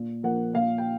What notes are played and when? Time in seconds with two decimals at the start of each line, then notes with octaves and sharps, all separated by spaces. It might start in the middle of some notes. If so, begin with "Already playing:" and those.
Already playing: A#2
0.23 F3 A#3 F#5
0.54 A#2 F5
0.78 G5